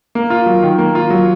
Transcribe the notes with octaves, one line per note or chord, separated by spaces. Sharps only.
A#3
F4
F#3
D#3
A#3
F4
F#3